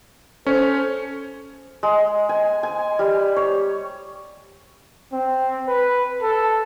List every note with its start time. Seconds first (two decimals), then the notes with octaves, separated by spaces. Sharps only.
0.46 C#4 A4 C5 C#5
1.83 G#3
2.29 G#5
2.63 G#5
2.99 G3
3.36 C#5
5.13 C4
5.67 B4
6.22 A4